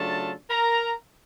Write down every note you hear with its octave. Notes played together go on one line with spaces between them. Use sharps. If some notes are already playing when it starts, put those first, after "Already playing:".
Already playing: C#3 F#3 A3 D4 F4 A4 A5
A#4 A#5